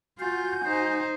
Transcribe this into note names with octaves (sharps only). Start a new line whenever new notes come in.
F4 F#4 G#5 G6
D#4 C5